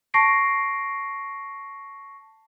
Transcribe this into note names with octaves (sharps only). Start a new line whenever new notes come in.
A5 C#6 A#6 C7 D7